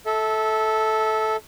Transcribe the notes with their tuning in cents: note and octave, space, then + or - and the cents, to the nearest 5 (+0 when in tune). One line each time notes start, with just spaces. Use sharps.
A4 -10 E5 -25